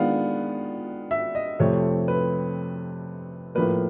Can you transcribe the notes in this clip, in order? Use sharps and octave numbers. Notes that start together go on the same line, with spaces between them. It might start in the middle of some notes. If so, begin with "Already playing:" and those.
Already playing: D#3 G#3 B3 D4 F4 F5 F#5
E5
D#5
F2 C3 F3 A3 C4 C#5
B4
A2 F3 A#3 B4